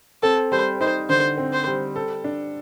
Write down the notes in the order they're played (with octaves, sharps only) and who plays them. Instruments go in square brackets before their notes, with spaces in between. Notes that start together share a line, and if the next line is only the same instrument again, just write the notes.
[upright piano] C4 [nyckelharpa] A4
[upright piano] G3 [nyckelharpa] C5
[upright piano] D#4 [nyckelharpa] C5
[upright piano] D3 [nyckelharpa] C5
[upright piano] C4
[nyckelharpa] C5
[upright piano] G3
A4
D4